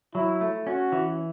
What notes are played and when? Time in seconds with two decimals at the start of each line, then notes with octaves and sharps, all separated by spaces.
0.15 F#3 E4
0.41 A3
0.67 C#4 F#4
0.92 E3